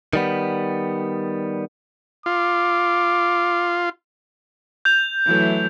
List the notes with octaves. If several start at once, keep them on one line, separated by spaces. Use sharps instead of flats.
D#3 G3 B3
F4 D6
G6 F7
E3 F#3 A3